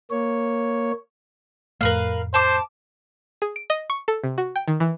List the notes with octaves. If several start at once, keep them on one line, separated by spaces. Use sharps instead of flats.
A#3 C#5
F2 A2 A3 A#4 B4 F5
C5 A5 D6
G#4
D7
D#5
C#6
A4
C3
F#4
G5
D#3
E3